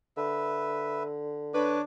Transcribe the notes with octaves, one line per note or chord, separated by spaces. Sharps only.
D3 B4 E5
D4 B4 C#5 D6